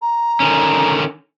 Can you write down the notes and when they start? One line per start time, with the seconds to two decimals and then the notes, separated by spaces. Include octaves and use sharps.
0.02 A#5
0.40 D3 D#3 C#4